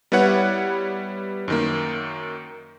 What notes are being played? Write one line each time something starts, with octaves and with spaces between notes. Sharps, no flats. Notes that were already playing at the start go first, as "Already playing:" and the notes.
G3 B3 E4 B4 C#5 F#5
F#2 D#3 A#3